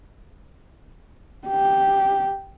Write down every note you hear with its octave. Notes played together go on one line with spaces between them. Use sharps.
G4